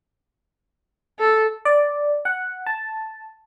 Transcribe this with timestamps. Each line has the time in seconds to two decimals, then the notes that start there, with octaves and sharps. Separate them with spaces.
1.19 A4
1.65 D5
2.25 F#5
2.67 A5